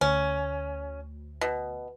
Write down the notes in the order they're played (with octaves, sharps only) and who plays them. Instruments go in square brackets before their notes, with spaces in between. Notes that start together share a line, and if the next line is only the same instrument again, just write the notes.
[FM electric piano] D2 [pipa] C#4
[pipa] B2